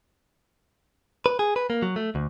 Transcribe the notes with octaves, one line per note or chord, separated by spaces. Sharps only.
B4
G#4
B4
A#3
F#3
A3
D2